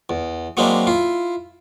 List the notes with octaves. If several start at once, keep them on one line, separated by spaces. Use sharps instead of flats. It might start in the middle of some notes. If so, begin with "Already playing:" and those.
E2
F#3 G#3 A#3 C4 D4 E4
E4 F4